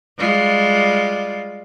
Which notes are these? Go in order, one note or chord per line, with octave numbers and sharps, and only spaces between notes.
G3 G#3 F4